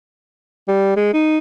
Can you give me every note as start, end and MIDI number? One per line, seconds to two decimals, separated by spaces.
0.68 0.96 55
0.97 1.13 56
1.13 1.38 63